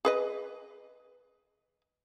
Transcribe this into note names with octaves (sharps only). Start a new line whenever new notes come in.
G#4 B4 D#5